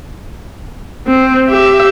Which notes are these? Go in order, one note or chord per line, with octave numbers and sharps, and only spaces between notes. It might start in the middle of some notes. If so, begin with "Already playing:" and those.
C4
G4 E5